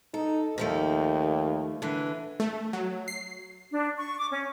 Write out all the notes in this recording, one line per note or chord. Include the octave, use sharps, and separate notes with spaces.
D#4 A4
D#2 D#3 F3 A3
D3 E3
A3
F#3
C7
D4
C#6
D6
C#4